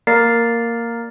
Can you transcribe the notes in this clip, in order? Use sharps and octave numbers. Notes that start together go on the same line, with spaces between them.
A#3 A#4 D5 A#5 A6 C7